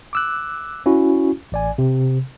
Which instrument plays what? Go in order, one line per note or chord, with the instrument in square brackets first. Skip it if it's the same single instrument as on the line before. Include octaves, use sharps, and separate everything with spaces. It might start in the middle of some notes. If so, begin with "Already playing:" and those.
[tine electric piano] D6 E6 F#6
C#4 E4 F#4
A1 D5 G#5
C3